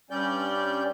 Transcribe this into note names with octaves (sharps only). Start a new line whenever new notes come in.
G2 G3 C#4 D5 G6